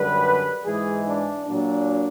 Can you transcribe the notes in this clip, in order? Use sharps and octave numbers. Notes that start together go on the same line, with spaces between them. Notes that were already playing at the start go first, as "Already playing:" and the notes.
Already playing: F#2 D3 G3 B4
G#2 E3 G#3 G#4
D4
A#2 F#3 A#3 D4